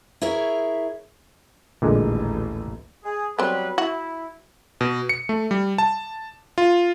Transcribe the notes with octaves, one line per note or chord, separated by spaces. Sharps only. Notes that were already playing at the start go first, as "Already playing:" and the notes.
E4 G#4 A#4 C#5 E5
A1 D#2 A#2 D3 G#3
G#4
F#3 G3 B3 C4 B4
E4 F#4
B2
C#7
A3
G3
A5
F4